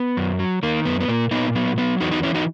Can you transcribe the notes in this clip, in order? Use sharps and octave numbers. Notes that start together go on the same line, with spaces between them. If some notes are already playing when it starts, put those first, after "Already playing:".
Already playing: B3
F#2
F#3
D#3 A#3
F#2 B3
B3
A#2 A#3
A#2 B3 D#4
F#3 B3
F#3 B3
E2 D#4 F#4
D#4 F#4
E3 C#4 E4
D#4 F#4